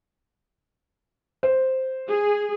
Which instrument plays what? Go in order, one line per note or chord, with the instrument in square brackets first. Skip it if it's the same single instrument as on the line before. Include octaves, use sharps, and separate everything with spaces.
[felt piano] C5
[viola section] G#4